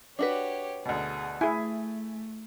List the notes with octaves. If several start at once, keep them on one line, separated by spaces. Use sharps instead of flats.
D4 F#4 G4 B4 C#5
D2 B2 G#4
A3 E4 G#4 G#5